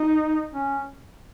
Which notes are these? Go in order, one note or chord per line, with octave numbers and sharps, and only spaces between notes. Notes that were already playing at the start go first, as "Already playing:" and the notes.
Already playing: D#4
C#4